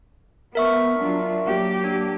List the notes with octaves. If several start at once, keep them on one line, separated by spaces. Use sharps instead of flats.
B3 A#4 E5 C#6
F#3 D4 F4
F#3 A#3 G4
D4